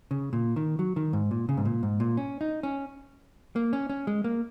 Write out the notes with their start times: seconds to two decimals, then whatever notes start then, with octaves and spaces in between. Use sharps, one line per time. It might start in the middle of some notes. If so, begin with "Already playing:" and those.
0.11 C#3
0.33 A#2
0.56 D#3
0.79 F#3
0.96 D#3
1.13 G#2
1.31 A#2
1.49 C#3
1.57 G#2
1.65 A#2
1.83 G#2
2.00 A#2
2.17 C#4
2.41 D#4
2.63 C#4
3.56 A#3
3.73 C#4
3.90 C#4
4.07 G#3
4.24 A#3